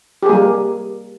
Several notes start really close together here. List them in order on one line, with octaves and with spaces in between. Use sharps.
G4 G#4 A#3 G3